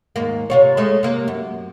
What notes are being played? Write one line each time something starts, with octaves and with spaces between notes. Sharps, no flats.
D#2 G#2 A#3
C3 F4 C#5
G#3 A3
C3 A#3
F#2